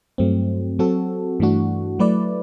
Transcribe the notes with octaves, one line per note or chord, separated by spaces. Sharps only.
G2 F#3 A3 C4
F#3 C4 F#4 A4
G2 E3 A3 D4 F#4
F#3 A3 E4 B4 D5